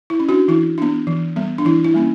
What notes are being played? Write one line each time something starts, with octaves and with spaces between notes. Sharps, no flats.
E4
C#4
D4 F#4
E3 E4
B3 D4
E3
G3 B3
D4
E3 E4
E4
G3 A#3 C#4